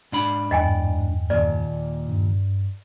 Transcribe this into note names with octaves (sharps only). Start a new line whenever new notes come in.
G#2 D4 B5
E2 G2 D#5 G5 G#5
D#2 A#2 D5
G2